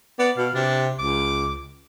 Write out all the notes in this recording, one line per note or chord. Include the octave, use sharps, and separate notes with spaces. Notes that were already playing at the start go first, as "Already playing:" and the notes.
B3 D5
B2 F5
C3 D4
C#2 D6